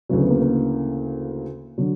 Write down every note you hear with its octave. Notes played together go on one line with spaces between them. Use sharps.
D2 C#3 E3 F#3
B3
A#3
A#3
D3 F#3